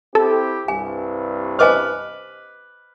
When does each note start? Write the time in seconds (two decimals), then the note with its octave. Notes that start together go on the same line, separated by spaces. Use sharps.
0.15 C4 E4 G4 A4
0.68 C2 G2 G#5
1.59 B4 C5 D#5 G#5 D6 F6